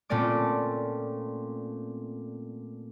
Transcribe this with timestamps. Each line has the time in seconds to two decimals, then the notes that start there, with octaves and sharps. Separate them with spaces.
0.09 A#2 A3 C4 C#4 D5 D6